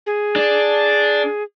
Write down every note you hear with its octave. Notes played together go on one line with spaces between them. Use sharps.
G#4
D4